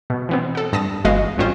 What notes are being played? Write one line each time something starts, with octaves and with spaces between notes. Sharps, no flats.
B2
E3 B3 C4
A4 F#5
G2 A5 D#6 A#6 E7
G1 E3 G#3 F#4 D#5 F5
A1 G2 C4 C#4 F4 C5